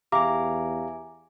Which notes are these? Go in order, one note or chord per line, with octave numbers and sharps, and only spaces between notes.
E2 G4 E5 F5 G#5 A#5 D6